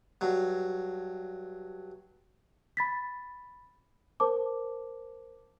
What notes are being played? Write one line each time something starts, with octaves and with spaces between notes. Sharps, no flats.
G2 F#3
B5 A6 B6
A#4 C5 A5 D6